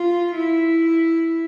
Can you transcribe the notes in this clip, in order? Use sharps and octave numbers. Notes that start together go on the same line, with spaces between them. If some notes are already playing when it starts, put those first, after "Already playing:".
Already playing: F4
E4